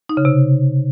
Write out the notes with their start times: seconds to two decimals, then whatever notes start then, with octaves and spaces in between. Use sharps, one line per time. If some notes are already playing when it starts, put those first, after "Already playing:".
0.09 D#4
0.17 C#3
0.25 C3